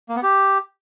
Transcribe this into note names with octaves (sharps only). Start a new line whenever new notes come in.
A#3
B3
G4